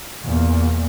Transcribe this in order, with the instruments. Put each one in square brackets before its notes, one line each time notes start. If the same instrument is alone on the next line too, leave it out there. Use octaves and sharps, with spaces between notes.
[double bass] E2 A#2